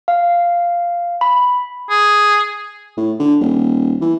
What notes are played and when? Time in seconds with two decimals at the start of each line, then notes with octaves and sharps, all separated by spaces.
0.08 F5
1.21 B5
1.90 G#4
2.97 A2
3.20 D3
3.41 D#1
4.01 E3